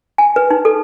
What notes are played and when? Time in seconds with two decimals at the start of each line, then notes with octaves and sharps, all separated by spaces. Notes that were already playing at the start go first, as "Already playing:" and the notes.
0.18 G#5
0.36 B4
0.50 D#4
0.65 A4